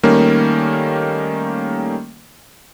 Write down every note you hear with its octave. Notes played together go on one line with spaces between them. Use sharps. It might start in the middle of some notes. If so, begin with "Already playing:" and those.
D#3 G3 A3 A#3 C#4